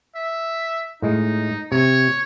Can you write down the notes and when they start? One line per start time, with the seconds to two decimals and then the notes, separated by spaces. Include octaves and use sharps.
0.15 E5
1.02 A2 G#3 D#4
1.72 C3 C#5